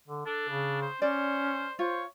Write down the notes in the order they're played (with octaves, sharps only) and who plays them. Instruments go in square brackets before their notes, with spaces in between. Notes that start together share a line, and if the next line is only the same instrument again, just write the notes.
[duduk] D3
[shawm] D4 [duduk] A4
[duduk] C#3
[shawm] C5
[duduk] C#4 [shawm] C5 [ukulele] D5
[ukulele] F4 [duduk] C5 [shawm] C#5